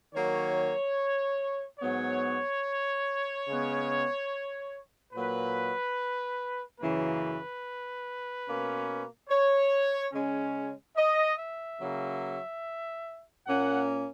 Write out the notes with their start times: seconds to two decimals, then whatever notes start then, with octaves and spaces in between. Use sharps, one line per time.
0.13 D#3 F#3 A#3 C#5
1.80 G#2 F#3 B3 C#5
3.47 C#3 G#3 B3
5.13 A#2 F#3 A#3 B4
6.79 F#2 C#3 E3 A#3 B4
8.46 B2 A#3 C#4
9.29 C#5
10.13 C#3 G#3 C#4
10.96 D#5
11.38 E5
11.79 C#3 F#3 A#3
13.46 A#2 A#3 C#4 F#5